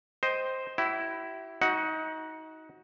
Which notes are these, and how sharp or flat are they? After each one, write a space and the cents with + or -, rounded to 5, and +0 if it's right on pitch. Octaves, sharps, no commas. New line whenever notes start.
C5 +0 D#5 +5 G5 +0
E4 +0 G4 -45
D#4 +25 F#4 +0 F#5 +0